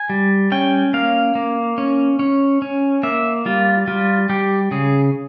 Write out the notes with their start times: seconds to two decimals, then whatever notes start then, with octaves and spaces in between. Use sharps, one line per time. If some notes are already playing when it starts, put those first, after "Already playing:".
Already playing: G#5
0.10 G3
0.52 C#4 G5
0.93 A#3 F5
1.35 A#3
1.78 C#4
2.19 C#4
2.62 C#4
3.03 A#3 E5
3.46 G3 F4
3.88 G3 F4
4.29 G3 G4
4.71 C#3 G#4